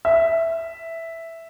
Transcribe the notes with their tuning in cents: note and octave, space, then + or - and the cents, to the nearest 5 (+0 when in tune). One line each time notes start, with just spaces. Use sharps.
E5 +0